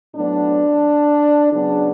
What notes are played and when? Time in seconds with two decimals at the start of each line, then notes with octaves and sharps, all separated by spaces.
0.15 A2 F#3 B3 D4
1.52 C#3 F#3 B3 D4